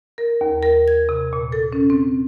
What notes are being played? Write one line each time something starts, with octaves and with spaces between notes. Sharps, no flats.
A#4
D#2
A#4
G#6
C3
A#2
A4
C#4
C4